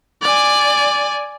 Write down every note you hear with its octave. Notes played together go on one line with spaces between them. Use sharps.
D5 G#5